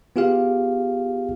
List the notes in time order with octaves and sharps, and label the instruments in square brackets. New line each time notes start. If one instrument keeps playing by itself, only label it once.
[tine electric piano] B3 F4 G4 G#4 F5